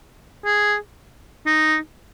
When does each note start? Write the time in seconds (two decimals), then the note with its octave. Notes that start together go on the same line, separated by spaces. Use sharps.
0.45 G#4
1.46 D#4